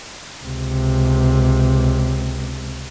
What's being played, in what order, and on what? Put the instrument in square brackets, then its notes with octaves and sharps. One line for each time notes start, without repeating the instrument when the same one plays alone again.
[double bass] C#2 C3